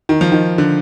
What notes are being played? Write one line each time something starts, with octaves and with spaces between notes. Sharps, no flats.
D#3
F3
D#3
D3